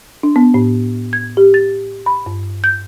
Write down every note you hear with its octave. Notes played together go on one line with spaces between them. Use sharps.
D4
B3
A2
G#6
G4
A6
B5
G2
G6